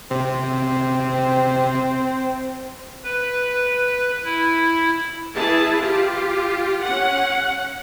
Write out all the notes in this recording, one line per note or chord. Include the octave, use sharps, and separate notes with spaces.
C3 C4
B4
E4
E3 E4 G#4 A5
F4 G4
C#4 F#5